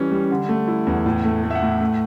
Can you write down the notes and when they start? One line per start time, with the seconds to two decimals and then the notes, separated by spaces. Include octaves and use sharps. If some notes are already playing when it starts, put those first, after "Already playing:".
Already playing: E3 G3 C#4
0.12 G3
0.31 D3
0.49 A3
0.68 E4
0.87 E2
1.06 A2
1.25 A3
1.44 A3
1.50 E5
1.55 F#5
1.62 A2
1.81 A3